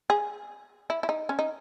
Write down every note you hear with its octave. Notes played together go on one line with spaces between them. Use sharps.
G#4
E4
E4
D#4
C#4
D#4